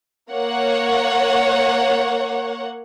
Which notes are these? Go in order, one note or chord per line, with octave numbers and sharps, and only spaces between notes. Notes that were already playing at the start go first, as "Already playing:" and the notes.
A#3 C#5 F#5